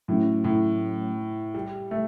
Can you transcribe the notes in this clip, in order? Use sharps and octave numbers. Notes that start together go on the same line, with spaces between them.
A2 F#3 A3 C#4
A2
G3
A3